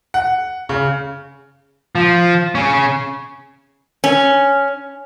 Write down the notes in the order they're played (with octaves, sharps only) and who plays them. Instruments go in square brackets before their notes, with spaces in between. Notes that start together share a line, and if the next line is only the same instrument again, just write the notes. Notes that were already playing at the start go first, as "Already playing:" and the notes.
[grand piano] F#5
C#3
[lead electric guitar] F3
C#3 C#4
[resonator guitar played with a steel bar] C#4